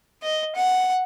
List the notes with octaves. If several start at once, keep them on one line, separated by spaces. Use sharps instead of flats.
D#5
F#5